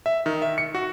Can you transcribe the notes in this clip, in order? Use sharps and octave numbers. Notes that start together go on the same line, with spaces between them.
E5
D#3
E5
C#7
F#4